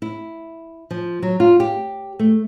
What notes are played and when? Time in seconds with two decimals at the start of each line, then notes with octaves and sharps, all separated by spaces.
0.02 E4
0.91 F3
1.22 F#3
1.40 F4
1.60 G4
2.19 A3